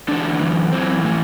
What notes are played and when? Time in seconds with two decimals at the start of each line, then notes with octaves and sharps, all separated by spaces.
0.08 E2 D3 D4
0.40 F#2 E3
0.72 F#2 E3 C4
1.03 A2 E3